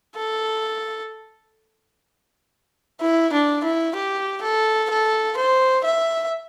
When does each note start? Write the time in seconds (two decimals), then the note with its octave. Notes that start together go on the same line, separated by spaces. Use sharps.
0.16 A4
3.01 E4
3.33 D4
3.64 E4
3.95 G4
4.42 A4
4.91 A4
5.37 C5
5.85 E5